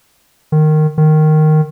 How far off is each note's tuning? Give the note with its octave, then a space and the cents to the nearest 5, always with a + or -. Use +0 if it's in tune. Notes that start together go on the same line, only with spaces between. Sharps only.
D#3 -15
D#3 -10